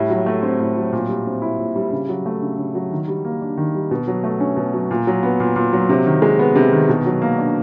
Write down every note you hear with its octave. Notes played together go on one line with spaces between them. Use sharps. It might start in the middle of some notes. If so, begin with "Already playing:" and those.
Already playing: A2 G3
F#3
A3
C4
A2
F#3
A#2
G3
C4
E4
A#2
G3
C#3
F#3
A3
C#3
C#3
F#3
D#3
G3
A#3
D4
D#3
G3
B2
F#3
A3
C#4
B2
F#3
A#2
F#3
B3
A#2
A#2
F#3
C3
D#3
G#3
B3
C3
D#3
B2
F#3
A#3
D4